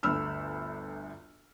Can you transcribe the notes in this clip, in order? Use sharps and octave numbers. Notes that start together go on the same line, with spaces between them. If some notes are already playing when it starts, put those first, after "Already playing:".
G1 D2 B5 E6 F6